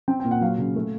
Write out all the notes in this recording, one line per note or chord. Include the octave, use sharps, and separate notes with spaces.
C4 G5
G5
A#2
F#5
F#3 F5
C#3
A3